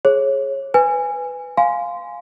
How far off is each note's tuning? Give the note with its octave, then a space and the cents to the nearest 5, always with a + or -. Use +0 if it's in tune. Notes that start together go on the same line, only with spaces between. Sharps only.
G#4 +10 C#5 -25
B4 +15 G#5 -15
F5 +0 G#5 +0 C6 -15